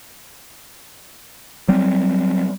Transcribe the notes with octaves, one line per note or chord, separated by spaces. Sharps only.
F#3 G3 C4